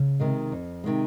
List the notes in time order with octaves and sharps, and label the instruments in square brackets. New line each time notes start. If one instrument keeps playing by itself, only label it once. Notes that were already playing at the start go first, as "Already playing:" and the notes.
Already playing: [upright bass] C#3
[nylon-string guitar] C3 D#3 G#3
F2
C3 D#3 G#3